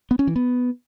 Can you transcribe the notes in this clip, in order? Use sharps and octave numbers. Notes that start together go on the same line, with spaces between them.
B3
C#4
E3
B3